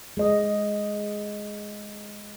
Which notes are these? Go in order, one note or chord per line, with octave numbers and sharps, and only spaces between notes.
G#3 D#5